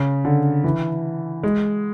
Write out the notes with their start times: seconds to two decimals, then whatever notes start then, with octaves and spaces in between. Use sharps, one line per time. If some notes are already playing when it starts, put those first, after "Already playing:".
Already playing: C#3
0.25 D3
0.64 E3
1.43 G#3